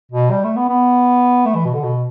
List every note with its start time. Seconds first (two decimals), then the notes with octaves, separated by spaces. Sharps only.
0.12 B2
0.31 G3
0.44 A3
0.57 B3
0.69 B3
1.46 A3
1.55 E3
1.65 B2
1.74 D3
1.84 B2